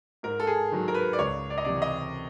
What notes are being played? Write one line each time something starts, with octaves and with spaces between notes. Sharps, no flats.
G#2 A#4
A4
G#4
D#3 F#3
A#4
B4
D5
C#2 C#5
D5
D#5
C3 E3 D5
D#5